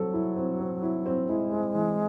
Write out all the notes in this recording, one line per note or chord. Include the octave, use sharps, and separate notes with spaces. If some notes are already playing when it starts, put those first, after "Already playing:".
Already playing: F#3 C4 A4
E4
C4
C4
E4
C4
G#3 E4
C4
E3